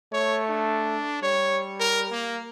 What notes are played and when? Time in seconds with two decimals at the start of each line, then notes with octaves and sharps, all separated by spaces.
0.13 A3 C#5
0.49 D4
1.22 G3 C#5
1.79 A#4
2.11 A#3